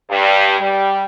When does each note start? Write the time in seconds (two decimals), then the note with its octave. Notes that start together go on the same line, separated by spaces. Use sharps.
0.10 G2
0.60 G3